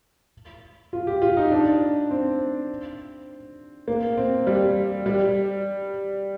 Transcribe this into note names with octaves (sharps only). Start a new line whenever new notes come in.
F4
G4
F4
D#4
D4
C4
A#3
C4
G3
G3